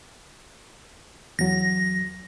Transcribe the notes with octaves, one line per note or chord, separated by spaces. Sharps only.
E2 F#3 A#6